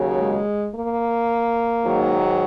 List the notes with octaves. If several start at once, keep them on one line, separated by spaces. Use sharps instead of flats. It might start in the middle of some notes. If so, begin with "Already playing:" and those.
Already playing: D#2 C#3 F#3
G#3
A#3
G#2 D#3 F#3